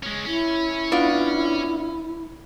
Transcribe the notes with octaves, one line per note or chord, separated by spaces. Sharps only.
G#3 C#4
C#4 E4
B3 D4 F4